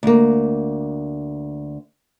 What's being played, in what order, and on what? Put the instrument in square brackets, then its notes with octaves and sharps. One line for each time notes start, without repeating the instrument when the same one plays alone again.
[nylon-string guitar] D2 A#3